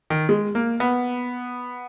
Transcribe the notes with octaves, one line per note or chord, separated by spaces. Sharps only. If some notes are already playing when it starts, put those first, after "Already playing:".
D#3
G#3
A#3
B3